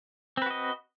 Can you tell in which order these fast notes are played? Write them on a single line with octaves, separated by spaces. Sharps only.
C4 B4 F#4 D#5